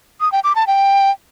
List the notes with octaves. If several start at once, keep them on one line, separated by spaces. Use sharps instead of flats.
D#6
G5
D6
A5
G5